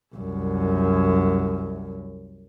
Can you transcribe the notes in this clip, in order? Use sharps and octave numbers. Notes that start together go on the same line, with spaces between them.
C2 F#2